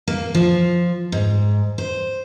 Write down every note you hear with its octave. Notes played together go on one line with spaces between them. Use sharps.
A#3
F3
G#2
C5